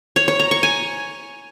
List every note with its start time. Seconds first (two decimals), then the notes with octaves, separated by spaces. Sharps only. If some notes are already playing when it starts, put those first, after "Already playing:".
0.16 C#5
0.28 C#5
0.40 A#5
0.51 C#6
0.63 G#5